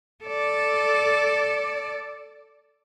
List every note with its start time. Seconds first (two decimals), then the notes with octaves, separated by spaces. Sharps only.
0.24 A4 D5